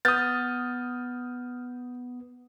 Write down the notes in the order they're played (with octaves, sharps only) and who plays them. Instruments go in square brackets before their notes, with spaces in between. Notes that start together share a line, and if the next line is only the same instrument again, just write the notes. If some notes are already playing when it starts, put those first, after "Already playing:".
[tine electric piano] B3 [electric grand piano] D#6 A6 [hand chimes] F6 G6